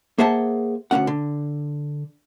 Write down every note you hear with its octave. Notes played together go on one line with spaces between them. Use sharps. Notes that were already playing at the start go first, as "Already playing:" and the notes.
A#3 G#4 C5 E5 F#5 A5
D2 G2 C#4 F#5
D3